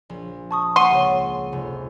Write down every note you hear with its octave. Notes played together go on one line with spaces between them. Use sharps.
A#1
A5 C#6 D#6
A#3 F#5 C6 C#6 D#7
C#2
F1